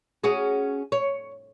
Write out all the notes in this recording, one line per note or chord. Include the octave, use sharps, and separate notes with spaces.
C#4 F#4 G#4
C#5